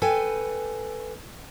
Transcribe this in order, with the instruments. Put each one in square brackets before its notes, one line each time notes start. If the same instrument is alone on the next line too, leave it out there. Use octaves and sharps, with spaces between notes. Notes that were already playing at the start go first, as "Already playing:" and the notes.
[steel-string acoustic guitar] A4 B4 G5 G#5